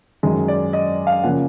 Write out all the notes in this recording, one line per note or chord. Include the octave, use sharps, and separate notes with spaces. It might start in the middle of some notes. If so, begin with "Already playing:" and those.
F#2 D#3 G#3 D#5
D5
D#5
F5
C#3 F3 A#3 C#4 F#5